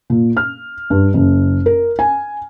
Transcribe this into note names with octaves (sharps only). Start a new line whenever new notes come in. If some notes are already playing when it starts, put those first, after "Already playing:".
A#2
F6
G2
F#1
A#4
G#5